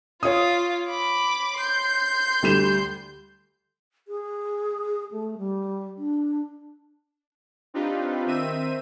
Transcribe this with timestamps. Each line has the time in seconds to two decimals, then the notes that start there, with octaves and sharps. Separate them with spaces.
0.23 F4 C#5 D#6
0.90 B5 D6
1.59 C6 G6
2.43 D2 G3 E7
4.08 G#4
5.12 A3
5.38 G3
5.98 D4
7.74 C4 D4 D#4 F4 G4 B4
8.26 D#3 C4 E5 D#7